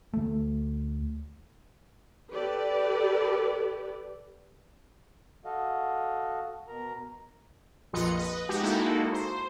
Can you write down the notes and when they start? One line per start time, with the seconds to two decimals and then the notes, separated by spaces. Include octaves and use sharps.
0.13 D2 A3
2.35 G4 A4 B4 D5
5.45 F#4 A4 D#5 F5
6.68 B2 A#4 A#5
7.93 A#1 F2 F4 B4 D#5 C#7
8.17 B4 D#5
8.49 G#3 D#4 F#4 G4
8.63 G#3 A#3 D#4 E4 F#4 A4
9.13 C5